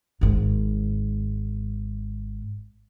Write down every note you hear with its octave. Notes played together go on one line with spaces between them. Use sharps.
G#1 G#2